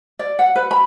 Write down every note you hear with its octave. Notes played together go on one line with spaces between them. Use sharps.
D5
F#5
B4
B5